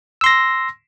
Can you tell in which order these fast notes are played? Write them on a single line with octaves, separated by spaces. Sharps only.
E6 C6 A#6